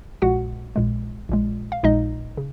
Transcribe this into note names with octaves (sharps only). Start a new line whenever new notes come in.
A#1 A#2 G#3 F#4 F#5
A#1 A#2 G#3
A#1 A#2 G#3
F5
A#1 A#2 G#3 D#4 D#5
C#3